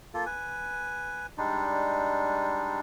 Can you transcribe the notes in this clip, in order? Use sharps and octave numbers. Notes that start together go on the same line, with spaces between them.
A#3 F4 A4
B4 G#5
G3 G#3 D4 D#4